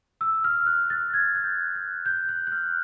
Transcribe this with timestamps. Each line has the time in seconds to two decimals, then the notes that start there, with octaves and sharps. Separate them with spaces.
0.21 E6
0.44 F6
0.67 F#6
0.90 A6
1.13 G#6
1.36 F#6
1.44 G6
1.75 F#6
2.06 G6
2.29 F#6
2.47 F#6
2.52 F6